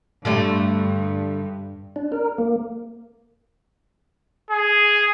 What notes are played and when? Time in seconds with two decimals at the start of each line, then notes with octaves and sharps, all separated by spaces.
0.25 G2 D3 G3 A3
1.96 D4
2.12 A#4
2.38 A#3
4.51 G#4